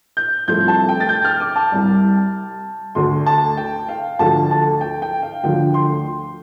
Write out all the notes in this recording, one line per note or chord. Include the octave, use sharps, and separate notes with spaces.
G6
C2 C3 F3 A3 C4 G6
A5
G5
A6
G6
F6
D6
A5
C2 C3 G3
D2 D3 A3 C6
A5
G5
F5
D2 D3 F3 A3 A5
A5
G5
G5
F5
D2 D3 F3 G5
C6